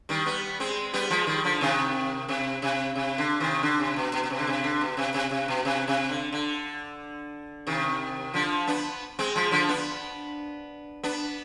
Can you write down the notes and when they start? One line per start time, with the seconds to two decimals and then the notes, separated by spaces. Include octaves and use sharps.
0.09 D#3 G3
0.26 G3 B3
0.60 G#3 C4
0.94 G3 B3
1.10 F3 G#3
1.27 D#3 G3
1.44 D3 F3
1.61 C3 D#3
2.29 C3
2.62 C3
2.96 C3
3.18 D3
3.40 C3 D#3
3.63 D3
3.80 C3
3.96 B2
4.13 B2
4.23 B2
4.30 C3
4.39 D3
4.47 C3
4.64 D3
4.81 B2
4.97 C3
5.14 C3
5.31 C3
5.48 B2
5.65 C3
5.88 C3
6.09 D3
6.33 D3
7.67 C3 D#3
8.34 D3 F3
8.68 B3 D4
9.19 G#3 C4
9.36 F3 G#3
9.51 D3 F3
9.69 B3 D4
11.03 B3 D4